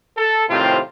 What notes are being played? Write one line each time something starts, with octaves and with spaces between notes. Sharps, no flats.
A4
A2 C3 D#3 C4 F4 G4